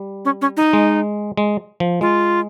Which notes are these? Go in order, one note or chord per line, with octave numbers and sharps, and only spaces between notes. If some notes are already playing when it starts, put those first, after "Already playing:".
Already playing: G3
C#4
C#4
D#4
G#3
G#3
F3
G#3 F4